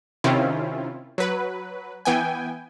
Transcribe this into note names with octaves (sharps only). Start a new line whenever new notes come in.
C3 D#3 C4 C#4 E4 F4
F#3 B4
E3 B3 G5 G#5